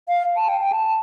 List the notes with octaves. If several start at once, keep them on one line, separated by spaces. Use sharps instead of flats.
F5
A5
G5
G5
A5